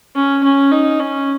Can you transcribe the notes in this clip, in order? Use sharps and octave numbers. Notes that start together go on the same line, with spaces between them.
C#4
C#4
D#4
C#4